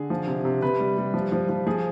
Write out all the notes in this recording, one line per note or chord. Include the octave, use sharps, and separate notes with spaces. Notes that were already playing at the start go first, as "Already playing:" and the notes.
Already playing: D3 G#4
F3
C3
C3
C3 B4
G3
G3
F3
F3
F3
F3 G#4